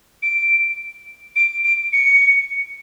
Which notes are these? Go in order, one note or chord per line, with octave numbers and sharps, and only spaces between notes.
D7
D7
D7
C#7